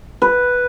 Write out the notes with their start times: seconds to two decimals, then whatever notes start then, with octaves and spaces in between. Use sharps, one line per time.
0.22 B4